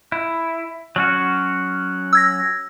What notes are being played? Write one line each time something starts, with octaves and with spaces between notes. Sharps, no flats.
E4
F#3 C#4 F#4
E6 G#6 A#6